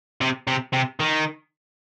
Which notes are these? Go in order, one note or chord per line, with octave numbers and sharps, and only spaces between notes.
C3
C3
C3
D#3